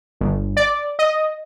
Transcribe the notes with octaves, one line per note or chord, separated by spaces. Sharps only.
G1
D5
D#5